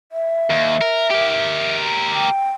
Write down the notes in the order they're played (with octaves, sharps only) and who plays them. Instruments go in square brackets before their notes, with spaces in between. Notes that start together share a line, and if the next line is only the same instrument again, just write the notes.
[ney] E5
[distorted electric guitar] D#2
A#4
G4 A#4
[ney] G5